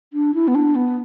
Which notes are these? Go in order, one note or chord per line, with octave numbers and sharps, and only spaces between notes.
D4
E4
B3
D4
B3